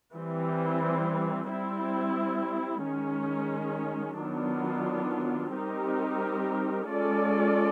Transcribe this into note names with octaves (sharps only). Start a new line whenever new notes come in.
E3 G3 C4
G3 C4 E4
D#3 G#3 C#4
D#3 F#3 B3 D4 F4
G3 C4 D#4 G4 A#4
G#3 C#4 F4 A4 D5